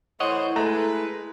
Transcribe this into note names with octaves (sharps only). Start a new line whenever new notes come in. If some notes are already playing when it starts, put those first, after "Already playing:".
E3 A3 E4 C5 C#5 D#5 F#5
G#3 A3 B4 A#5